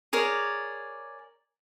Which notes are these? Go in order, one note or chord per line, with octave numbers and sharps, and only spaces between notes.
G#4 A#4 C#5 D5